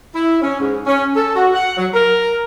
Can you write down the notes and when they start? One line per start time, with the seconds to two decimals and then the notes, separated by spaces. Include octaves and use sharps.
0.14 E4
0.42 C#4
0.60 G#2
0.87 C#4
1.15 A4
1.36 F#4
1.54 F#5
1.77 F#3
1.93 A#4